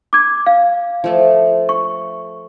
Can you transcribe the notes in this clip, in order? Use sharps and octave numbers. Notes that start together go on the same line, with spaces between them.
D6 G#6
F5
F3 A3 A4
C#6